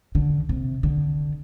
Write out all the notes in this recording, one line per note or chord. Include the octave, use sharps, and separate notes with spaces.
D3
C3
D3